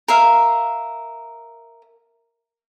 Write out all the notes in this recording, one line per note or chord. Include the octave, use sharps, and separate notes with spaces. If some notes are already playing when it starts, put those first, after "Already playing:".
A#4 E5 F5